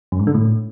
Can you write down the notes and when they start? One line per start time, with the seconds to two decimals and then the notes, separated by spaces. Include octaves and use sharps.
0.12 F#2
0.20 G#2
0.27 D3
0.34 A2